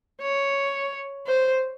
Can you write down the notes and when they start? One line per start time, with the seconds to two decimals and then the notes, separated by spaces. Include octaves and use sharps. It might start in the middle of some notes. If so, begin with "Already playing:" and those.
0.22 C#5
1.27 C5